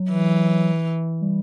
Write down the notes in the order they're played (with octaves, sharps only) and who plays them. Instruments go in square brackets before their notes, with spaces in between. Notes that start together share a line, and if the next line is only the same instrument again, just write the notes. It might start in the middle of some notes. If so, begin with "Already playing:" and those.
Already playing: [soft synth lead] F#3
[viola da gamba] E3
[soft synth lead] G3